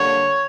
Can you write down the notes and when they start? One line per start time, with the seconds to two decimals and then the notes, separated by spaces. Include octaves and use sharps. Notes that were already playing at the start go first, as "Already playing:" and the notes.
Already playing: D3 G3 A#3 C#5